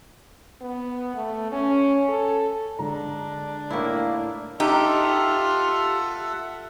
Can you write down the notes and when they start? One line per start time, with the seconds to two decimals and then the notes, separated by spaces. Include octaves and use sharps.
0.62 B3
1.15 A3
1.52 C#4
2.09 A4
2.79 D3 G#3 D4 A#5
3.70 A2 A#3 E4
4.60 D#4 F4 G4 A4 E5 F#5